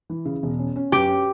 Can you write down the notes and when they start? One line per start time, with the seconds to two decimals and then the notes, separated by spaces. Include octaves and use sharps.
0.10 E3
0.25 C#3
0.43 E1
0.59 C#4
0.76 C#4
0.92 F#2 G4
1.08 C#4